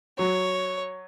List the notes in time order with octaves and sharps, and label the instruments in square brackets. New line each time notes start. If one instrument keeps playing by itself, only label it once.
[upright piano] F#3 [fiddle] C#5